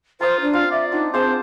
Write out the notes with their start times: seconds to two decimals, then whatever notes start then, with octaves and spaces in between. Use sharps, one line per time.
0.21 F4 C5 A#5 D#6
0.41 D4
0.54 C4 F4 F5
0.71 D5 E5
0.92 D4 D#4 F4 F#5
1.14 C4 G#4 C5 F5 A5